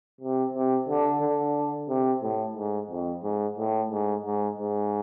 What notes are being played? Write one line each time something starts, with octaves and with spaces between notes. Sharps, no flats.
C3
C3
D3
D3
C3
A2
G#2
F2
G#2
A2
G#2
G#2
G#2